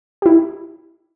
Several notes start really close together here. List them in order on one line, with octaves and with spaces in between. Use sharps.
G4 E4 D#4